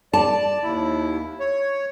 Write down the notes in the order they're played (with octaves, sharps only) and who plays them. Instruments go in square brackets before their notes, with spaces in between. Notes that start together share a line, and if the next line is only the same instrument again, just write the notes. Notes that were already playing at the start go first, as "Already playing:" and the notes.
[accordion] D5 [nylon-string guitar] A5
[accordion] D#2 E4
C#5